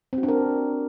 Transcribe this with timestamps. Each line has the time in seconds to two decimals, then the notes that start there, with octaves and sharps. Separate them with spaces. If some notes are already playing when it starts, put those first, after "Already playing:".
0.13 C4
0.18 F#4
0.23 D4
0.28 A#4